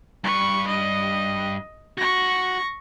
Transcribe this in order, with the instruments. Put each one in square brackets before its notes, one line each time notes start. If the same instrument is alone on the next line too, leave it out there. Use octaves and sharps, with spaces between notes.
[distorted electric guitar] G2 B4 [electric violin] C#6
[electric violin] D#5
[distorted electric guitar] F#4 [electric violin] C#6 A#6